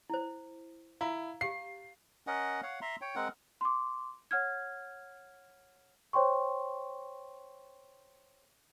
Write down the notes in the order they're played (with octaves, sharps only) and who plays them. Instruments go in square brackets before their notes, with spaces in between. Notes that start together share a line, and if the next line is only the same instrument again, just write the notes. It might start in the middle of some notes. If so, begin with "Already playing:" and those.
[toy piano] E4 C5
[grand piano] E4 [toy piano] F5 A#5
[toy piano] G4 F5 [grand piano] C7
[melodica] C#4 A#4 D#5 F#5
C#5 F5 F#5
E5 A#5 C6
C#5 G5
G#3 C4 A#4 F#5
[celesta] C6 D6
C#5 F#5 F6 G#6
C5 C#5 G5 C6 C#6